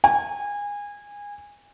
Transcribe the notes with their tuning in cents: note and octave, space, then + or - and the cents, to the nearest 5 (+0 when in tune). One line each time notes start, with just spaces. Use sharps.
G#5 -25